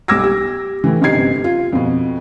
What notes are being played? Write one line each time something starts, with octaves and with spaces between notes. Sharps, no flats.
B1 G3 D6 E6 G#6 A#6
G4
A2 E3
G1 F#2 C3 D#4 G#6 C7
F4
F2 B2